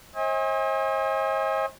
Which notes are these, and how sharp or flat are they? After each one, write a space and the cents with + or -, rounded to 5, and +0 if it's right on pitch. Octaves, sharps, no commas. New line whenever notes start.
C5 +45 D#5 +40 G#5 -35